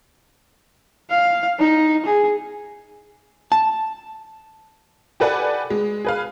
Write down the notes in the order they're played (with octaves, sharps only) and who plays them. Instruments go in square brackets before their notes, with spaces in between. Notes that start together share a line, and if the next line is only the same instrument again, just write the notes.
[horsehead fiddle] F5
D#4
G#4
[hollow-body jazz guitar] A5
[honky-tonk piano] G4 A4 B4 D5 F#5 G#5
G#3
G#4 B4 F5